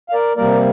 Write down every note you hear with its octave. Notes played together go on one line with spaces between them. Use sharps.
F5
A#4 D5
C3 G3 A#3 A#4 D5